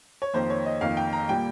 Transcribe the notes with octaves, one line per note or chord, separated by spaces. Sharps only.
C#5
F2 D#3 A#3 C5
C#5
D#5
F2 D#3 A#3 F5
G5
A#5
A#2 G3 A#3 G5